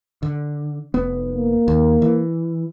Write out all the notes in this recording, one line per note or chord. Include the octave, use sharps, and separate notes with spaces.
D3
F1 B3
A#3
D#2
E3